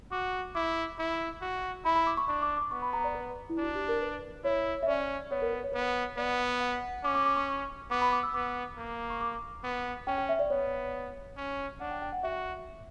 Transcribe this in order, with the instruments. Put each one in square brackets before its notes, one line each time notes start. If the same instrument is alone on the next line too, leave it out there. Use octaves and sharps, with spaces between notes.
[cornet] F#4 [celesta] D6
[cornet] E4 [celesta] D6
[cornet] E4
F#4
[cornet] E4 [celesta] B5
[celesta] B5
D6
C#6
[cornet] D4 [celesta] C#6
[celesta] D6
D6
[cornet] B3 [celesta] C#6
[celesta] B5
A#5
D5
B4
E4
[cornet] D4 [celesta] F#4
[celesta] G4
A#4
B4
[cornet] E4 [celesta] C#5
[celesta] E5
[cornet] C#4 [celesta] D5
[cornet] B3 [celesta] C#5
[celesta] A#4
B4
C#5
[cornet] B3 [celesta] B4
[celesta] C#5
[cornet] B3 [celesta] D5
[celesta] F#5
F#5
[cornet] C#4 [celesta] D6
[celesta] D6
D6
C#6
[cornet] B3 [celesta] D6
[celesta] B5
D6
E6
[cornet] B3 [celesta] D6
[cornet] A#3
[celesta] C#6
D6
[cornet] B3
[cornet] C#4 [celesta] G5
[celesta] G5
E5
D5
[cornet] B3 [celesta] C#5
[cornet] C#4
[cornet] D4 [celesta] F#5
[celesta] G5
G5
F#5
[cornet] F#4 [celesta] E5